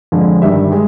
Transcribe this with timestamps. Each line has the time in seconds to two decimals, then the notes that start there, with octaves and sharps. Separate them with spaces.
0.12 F2 D3 F3 G#3
0.42 G2 D#3 G3 E5
0.72 G#3